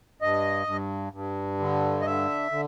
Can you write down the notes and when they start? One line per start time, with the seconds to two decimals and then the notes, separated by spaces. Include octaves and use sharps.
0.21 G2 D#5
0.67 G2
1.13 G2
1.60 D3
2.01 D#5
2.06 D3 E5
2.52 D3